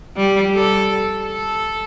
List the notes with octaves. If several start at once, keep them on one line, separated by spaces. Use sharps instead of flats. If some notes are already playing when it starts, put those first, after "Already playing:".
G3
A4
A4